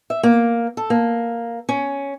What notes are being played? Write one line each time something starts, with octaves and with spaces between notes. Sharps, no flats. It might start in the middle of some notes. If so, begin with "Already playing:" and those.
E5
A#3
A4
A#3
C#4